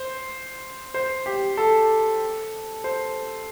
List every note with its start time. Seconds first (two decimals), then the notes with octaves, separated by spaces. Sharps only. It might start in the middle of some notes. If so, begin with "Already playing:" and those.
Already playing: C5
0.94 C5
1.26 G4
1.57 A4
2.84 C5